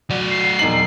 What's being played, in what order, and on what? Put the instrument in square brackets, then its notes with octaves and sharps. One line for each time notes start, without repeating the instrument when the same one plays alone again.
[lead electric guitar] F#3 D5 [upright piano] F#4
[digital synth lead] C7
[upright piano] E1 D#4 F#7